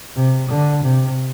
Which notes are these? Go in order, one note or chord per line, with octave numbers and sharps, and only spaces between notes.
C3
D3
C3